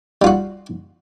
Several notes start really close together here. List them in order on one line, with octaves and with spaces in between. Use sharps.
G3 F4 F#4